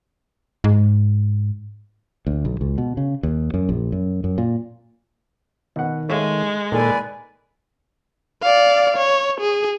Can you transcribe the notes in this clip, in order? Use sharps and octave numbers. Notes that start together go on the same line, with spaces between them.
G#2
D2
B1
C#2
B2
C#3
D#2
F#2
A#1
F#2
F#2
A#2
B2 D#3 F#5
G#3 A3 C#5 F5
A#2 D#3 A#3 G#4 A4 B4 D5 G#5
D5 F5
C#5
G#4